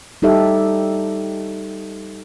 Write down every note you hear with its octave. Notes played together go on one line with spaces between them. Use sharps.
G3 D#4 G4 A4 E5